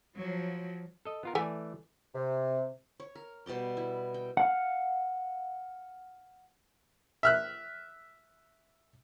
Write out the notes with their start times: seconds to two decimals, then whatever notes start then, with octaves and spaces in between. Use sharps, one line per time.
0.16 F3 F#3
1.05 A4 D#5
1.23 B3 F4 A#4
1.35 E3 A3 A4 D5 E5 G#5
2.15 C3
3.00 C#5
3.15 A#4
3.46 B2 G3 D5 G5
3.77 E4
4.14 G5
4.37 F5 F#5
7.23 E5 F6 F#6